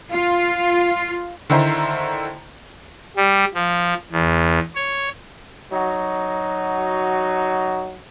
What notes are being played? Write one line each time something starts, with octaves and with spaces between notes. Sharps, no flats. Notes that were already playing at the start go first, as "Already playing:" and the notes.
F4
D3 D#3 E4 C5 A#5 C6
G3
F3
E2
C#5
F#3 D#4 F#4